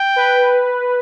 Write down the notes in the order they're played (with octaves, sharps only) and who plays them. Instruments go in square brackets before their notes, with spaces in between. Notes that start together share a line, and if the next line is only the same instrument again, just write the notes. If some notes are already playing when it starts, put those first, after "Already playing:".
Already playing: [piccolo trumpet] G5
[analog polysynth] B4